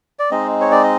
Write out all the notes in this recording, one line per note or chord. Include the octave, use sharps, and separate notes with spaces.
D5
G#3 C4 D#4 D#5
C#5
D5
D#5